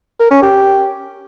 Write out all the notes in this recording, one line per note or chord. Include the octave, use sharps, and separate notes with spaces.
A#4
C#4
G4